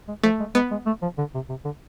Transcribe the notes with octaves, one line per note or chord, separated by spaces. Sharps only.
G#3
F3 A3
G#3
G#3 B3
G#3
A3
F3
D3
C3
C3
D3